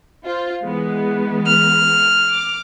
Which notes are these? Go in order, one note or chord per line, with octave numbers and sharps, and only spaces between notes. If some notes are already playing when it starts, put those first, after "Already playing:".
F4 C5
E3 G#3 B3
F6
D6